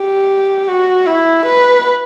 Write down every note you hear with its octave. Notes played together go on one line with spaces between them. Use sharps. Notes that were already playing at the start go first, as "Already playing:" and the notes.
Already playing: G4
F#4
E4
B4